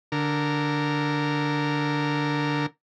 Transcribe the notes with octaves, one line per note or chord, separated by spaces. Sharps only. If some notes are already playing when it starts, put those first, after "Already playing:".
D3 A#4